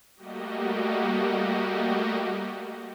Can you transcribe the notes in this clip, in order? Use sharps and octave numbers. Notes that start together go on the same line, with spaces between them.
G3 A3 A#3 F#4 G4 D#5